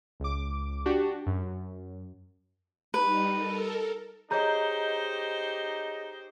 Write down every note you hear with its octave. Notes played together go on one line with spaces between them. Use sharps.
C#2 D6
D4 F#4 G4
F#2
G3 D#4 B4
A4 A#4
D#4 G4 G#4 C5 C#5 D#5 A#5 G6